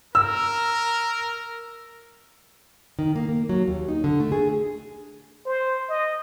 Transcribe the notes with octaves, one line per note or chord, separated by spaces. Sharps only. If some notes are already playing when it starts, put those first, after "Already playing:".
A#4 E6
D#3
A#3
A#3
F#3
D#2
D#4
D3
A3
G#4
C5
D#5